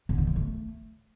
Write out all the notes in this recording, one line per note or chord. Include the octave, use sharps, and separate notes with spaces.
D3
G#3
D3
A3